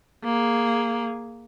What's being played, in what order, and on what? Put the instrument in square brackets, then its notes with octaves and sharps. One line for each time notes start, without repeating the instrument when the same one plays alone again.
[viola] A#3 G#4